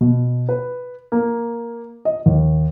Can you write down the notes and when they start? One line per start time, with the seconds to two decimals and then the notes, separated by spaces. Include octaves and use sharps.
0.01 B2
0.49 B4
1.12 A#3
2.05 D#5
2.26 D#2